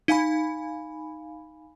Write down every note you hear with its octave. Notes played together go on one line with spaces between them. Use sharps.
D#4 F5 G#5 B5